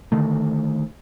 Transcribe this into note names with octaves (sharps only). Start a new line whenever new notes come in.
D3 D#3 A3